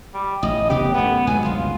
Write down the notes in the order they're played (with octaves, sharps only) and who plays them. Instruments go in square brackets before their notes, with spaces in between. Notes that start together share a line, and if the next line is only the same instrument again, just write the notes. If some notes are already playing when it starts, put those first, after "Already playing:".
[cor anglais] G3
[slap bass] A1 [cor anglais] D#5
[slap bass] F1 C#3 B3 [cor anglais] G4
[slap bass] F#2 A3 [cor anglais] B3
[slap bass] G#2 F#3 [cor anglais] G#5
[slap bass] G1 C#2 [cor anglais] F4